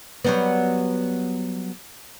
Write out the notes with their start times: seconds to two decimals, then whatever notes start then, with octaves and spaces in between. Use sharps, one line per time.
0.24 F#3 G3 B3